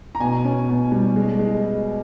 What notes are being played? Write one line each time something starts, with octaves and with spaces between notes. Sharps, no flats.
A#5
B2 G#5
C#4
B2
G3
G#3
G#3